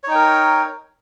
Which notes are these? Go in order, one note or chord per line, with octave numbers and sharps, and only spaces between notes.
D#4 A#4 C#5 G5